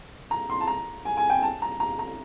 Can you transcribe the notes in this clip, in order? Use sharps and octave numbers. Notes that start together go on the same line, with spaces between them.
A#5
C6
A5
A#5
G#5
G#5
G5
A5
A#5
A#5
A#5